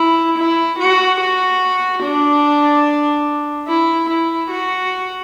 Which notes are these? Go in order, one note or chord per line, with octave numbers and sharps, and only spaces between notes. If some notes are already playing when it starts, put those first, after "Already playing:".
Already playing: E4
E4
F#4
F#4
D4
E4
E4
F#4